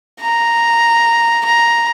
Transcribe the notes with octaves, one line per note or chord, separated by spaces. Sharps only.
A#5
A#5